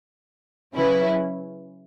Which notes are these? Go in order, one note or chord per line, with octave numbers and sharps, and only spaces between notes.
C#3 F#3 C#4 E4 B4